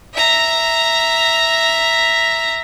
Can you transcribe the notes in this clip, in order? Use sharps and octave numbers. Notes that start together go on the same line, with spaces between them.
E5 A#5